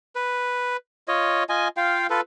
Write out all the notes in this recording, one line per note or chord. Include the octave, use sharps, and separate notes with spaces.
B4
F4 C#5 D#5
F4 D#5 G#5
F4 F5 G5
F4 A4 B4